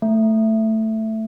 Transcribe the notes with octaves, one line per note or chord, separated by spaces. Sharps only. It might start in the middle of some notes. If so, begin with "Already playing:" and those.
A3